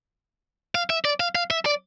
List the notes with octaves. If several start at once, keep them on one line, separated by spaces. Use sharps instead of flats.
F5
E5
D5
F5
F5
E5
D5